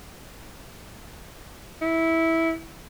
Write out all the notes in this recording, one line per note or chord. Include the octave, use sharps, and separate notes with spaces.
E4